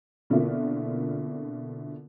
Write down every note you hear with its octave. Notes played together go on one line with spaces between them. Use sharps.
B2 D3 A#3 C4 E4 F4